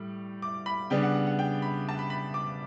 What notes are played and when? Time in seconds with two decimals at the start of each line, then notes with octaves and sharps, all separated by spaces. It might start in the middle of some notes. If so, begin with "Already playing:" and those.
Already playing: A2 G3
0.42 D6
0.66 B5
0.90 C#3 G3 B3 D4 G5
1.03 F#5
1.15 F#5
1.27 F#5
1.39 G5
1.62 B5
1.89 A5
1.99 B5
2.10 B5
2.34 D6